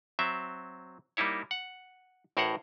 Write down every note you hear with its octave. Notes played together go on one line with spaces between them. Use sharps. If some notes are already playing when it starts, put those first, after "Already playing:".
F#3 C4 E5
G3 A#3 D#4 E4 C#5
F#5
A1 A2 A#4 C5 C#5 F#5